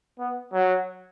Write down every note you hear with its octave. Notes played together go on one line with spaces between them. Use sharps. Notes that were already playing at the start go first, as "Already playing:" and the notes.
B3
F#3